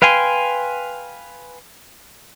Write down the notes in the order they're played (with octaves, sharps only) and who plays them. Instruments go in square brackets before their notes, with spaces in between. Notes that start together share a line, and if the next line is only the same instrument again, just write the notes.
[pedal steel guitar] B4 F5 G5 G#5 C6